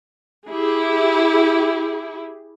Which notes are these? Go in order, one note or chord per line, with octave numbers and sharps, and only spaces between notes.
E4 G4 G#4